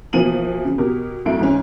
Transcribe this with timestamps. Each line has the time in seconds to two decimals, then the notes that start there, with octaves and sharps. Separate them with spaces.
0.13 B2 E3 F3 A#3 D#7 F#7
0.65 C#3
0.78 B2 G4 A#4
1.26 C2 F#2 A3 D7
1.39 G#2 E3 C#4